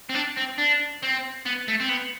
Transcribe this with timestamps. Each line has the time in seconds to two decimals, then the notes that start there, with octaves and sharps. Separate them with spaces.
0.09 C4
0.15 D4
0.37 C4
0.58 D4
1.03 C4
1.45 B3
1.68 A3
1.80 C4
1.89 B3